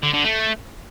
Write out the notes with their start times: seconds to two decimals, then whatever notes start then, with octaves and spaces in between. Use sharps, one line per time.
0.03 D3
0.14 D3
0.24 A3